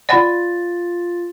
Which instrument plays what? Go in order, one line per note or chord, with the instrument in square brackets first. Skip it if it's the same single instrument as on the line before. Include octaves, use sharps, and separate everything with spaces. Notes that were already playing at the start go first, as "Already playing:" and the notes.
[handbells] F4 A6 [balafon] D5 F#5 B5